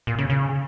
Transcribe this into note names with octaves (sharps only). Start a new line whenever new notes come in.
A#2
C#3
C#3